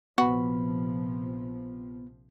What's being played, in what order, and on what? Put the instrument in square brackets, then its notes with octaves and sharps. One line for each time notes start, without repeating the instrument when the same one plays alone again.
[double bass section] A#1 C3 F3 [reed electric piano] B3 B5 [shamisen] F#4